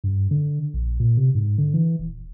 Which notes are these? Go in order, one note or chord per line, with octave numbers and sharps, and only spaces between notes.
G2
D3
A#1
A#2
C3
G#2
D3
E3
D#1